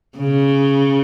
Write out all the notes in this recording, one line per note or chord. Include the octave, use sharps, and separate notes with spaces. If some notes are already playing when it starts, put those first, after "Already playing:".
C#3